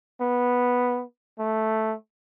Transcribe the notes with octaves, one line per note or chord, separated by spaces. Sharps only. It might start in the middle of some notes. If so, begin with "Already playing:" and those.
B3
A3